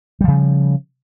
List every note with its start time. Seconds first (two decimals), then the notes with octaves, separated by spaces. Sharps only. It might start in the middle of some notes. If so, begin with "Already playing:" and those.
0.21 G3
0.24 F3
0.28 C#3